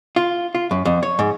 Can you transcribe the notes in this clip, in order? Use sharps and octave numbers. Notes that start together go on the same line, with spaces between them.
F4
F4
F#2
F2
C#5
G#2